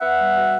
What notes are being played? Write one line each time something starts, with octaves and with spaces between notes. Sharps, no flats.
B3 E5 F#5
G3
B2